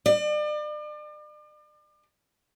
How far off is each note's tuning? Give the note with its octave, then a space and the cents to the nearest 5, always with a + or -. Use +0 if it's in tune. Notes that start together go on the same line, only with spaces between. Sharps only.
D5 +40